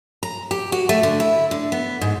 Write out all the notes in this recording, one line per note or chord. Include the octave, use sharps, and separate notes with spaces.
A#5
G4
F#4
A3
D3
E4
D3
B3
G#2